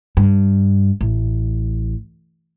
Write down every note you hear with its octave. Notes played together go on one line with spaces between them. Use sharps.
G2
A1